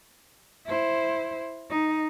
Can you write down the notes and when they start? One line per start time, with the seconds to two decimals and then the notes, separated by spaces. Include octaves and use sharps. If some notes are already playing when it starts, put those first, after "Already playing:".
0.66 E4 C5
1.70 D#4